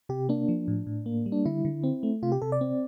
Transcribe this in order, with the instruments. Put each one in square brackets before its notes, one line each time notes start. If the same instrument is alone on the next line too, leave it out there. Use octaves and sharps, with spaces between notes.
[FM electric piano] C3 G4
A#3 D4
F3
A2
A2
A#3
G3
D4
D3 E4
D3
C4
A3
C3 F4
G4
C3 A4
D5
C4